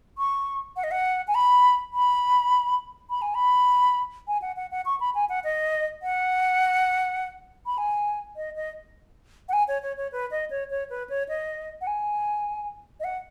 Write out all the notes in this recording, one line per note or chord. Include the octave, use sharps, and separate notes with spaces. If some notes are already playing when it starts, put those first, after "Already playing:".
C#6
F#5
D#5
F#5
G#5
B5
B5
B5
G#5
B5
G#5
F#5
F#5
F#5
C#6
B5
G#5
F#5
D#5
F#5
B5
G#5
D#5
D#5
F#5
G#5
C#5
C#5
C#5
B4
D#5
C#5
C#5
B4
C#5
D#5
F#5
G#5
D#5
F#5